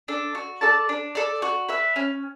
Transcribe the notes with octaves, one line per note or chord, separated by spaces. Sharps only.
D4 A4
F#4
A4 D5 A5
D4
A4 D5
F#4
B4 E5
C#4